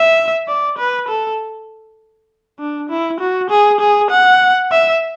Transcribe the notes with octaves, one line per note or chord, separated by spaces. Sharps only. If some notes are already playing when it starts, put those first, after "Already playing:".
Already playing: E5
D5
B4
A4
D4
E4
F#4
G#4
G#4
F#5
E5